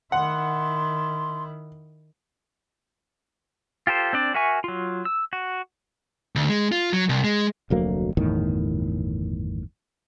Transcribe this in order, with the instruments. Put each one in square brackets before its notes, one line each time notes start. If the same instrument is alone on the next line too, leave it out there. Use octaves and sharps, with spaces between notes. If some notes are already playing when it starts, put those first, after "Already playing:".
[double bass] D#3 E4 [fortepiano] F#5 [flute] C6
[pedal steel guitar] F4 G4 A4 C5
C4 D4 D5
F#4 A#4 E5 G#5 C#6
F#3 F4
E6
F#4
[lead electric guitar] D2
G#3
F4
F#3
C2
G#3
[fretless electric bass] F1 D2 F#3 A#3
G1 E2 A2 D#3